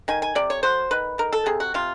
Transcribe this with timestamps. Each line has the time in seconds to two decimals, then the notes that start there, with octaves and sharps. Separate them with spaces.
0.08 D#3 G#5
0.22 G#5
0.35 C3 D5
0.50 C#5
0.63 F#3 C5
0.91 D#3 B4
1.18 D#3 A#4
1.33 A4
1.46 C3 G#4
1.60 F#4
1.74 C3 F4